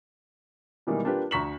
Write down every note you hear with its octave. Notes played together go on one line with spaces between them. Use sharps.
B2 D#3 E3 G3 G#3 A#3
A#3 D4 F4 G4 B4
D2 A#5 C#6 B6 E7 F#7